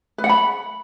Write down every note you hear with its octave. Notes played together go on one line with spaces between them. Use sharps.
B4
F#5
B5